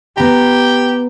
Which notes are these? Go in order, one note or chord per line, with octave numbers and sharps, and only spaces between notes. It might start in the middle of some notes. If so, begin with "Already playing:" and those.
B3 G4 A#5